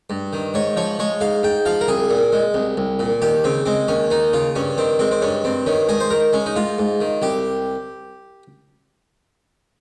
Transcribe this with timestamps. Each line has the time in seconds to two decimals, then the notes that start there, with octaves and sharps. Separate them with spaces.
0.10 G2
0.33 D#3
0.54 G#2 C#5
0.76 F3 C#5
0.99 G#3 C#5
1.21 G#2 F5
1.43 G#2 G5
1.66 F3 F5
1.81 A#4
1.88 C2 G#4
2.10 A#2
2.32 G#3
2.54 C2
2.77 C2
2.99 A#2
3.22 D#2 G4
3.44 C#3 C4
3.66 G#3 C4
3.88 D#2 C#4
4.11 D#2 D#4
4.33 C#3 F4
4.56 G2 C#4
4.77 D#3 C4
4.99 G#3 C4
5.11 C4
5.22 G2 C#4
5.44 G2 C4
5.66 D#3 C#4
5.89 G#2 G#4
6.00 C5
6.11 D#3 A#4
6.33 G#3 C#4
6.46 D#4
6.56 G#2 F4
6.78 G#2
7.01 D#3
7.22 C2 G4